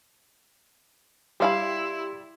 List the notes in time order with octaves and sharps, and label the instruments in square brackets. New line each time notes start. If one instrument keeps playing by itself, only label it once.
[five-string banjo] G3 F5 B5 [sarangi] E4 [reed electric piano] G4 C6